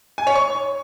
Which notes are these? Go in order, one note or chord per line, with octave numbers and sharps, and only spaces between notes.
G#5
C#5
C#6